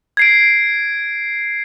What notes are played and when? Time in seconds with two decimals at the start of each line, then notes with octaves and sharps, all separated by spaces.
0.17 G#6 C7 D7